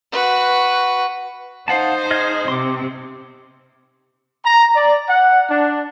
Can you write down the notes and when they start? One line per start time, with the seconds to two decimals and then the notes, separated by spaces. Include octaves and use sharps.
0.12 F#4 B4
1.68 D#4 C5 F5 F#5 A5
2.11 G#4 D#5 F6
2.48 C3 C6 D6
4.44 A#5
4.75 D5
5.08 F#5
5.49 D4